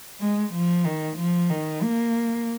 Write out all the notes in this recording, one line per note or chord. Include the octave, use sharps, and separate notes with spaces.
G#3
F3
D#3
F3
D#3
A#3